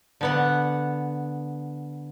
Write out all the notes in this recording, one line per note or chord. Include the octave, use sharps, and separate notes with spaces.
D3 B3 F#5